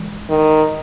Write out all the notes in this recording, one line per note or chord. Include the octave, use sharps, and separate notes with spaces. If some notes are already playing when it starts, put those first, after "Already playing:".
Already playing: E3 G#3
D#3